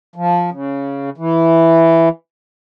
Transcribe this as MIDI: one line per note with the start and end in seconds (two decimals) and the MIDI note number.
0.16 0.50 53
0.52 1.10 49
1.18 2.09 52